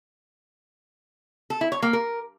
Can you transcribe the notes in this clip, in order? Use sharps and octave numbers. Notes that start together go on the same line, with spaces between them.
A4
E4
C#5
A#3
A#4